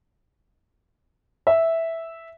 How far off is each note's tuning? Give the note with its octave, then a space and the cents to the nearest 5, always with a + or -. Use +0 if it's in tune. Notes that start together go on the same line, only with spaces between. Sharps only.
E5 -5